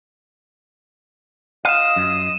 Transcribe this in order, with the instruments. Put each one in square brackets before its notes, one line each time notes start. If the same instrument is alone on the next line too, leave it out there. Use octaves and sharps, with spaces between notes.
[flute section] F4 D#5 D#6 [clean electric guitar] F5 [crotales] D#7 E7
[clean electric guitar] F#2